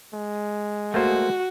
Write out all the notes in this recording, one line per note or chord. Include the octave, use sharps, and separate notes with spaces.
G#3
A3 A#3 F#4 C5